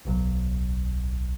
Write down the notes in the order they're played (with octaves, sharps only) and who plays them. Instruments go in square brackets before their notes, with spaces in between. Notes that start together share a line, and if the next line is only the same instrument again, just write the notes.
[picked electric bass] D1 B1 F#3